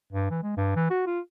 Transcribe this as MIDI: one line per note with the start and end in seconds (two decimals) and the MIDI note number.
0.13 0.29 43
0.31 0.40 52
0.43 0.55 56
0.57 0.72 43
0.76 0.88 52
0.90 1.02 66
1.07 1.20 65